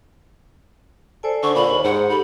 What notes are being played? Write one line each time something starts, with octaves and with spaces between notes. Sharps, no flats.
A4 C5 D5 G#5
D3 C#6
A#2 B5
D#2
G#2 F#5
G4 A4 B5